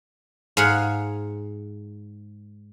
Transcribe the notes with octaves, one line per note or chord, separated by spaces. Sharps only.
G#2 G#4 F5 F#5